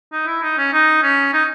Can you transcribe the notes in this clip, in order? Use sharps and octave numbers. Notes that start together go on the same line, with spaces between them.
D#4
E4
D#4
C#4
D#4
C#4
D#4